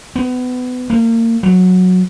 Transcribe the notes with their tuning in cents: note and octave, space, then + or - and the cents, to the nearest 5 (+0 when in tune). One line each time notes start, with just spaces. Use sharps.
B3 +25
A#3 -30
F#3 -15